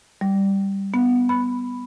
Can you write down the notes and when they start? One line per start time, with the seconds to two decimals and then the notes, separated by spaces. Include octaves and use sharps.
0.21 G3
0.94 B3
1.29 B5